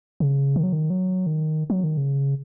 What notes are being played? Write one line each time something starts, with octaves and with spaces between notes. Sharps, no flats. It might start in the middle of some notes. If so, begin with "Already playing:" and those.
C#3
D#3
F#3
D#3
F#3
D#3
F#3
D#3
C#3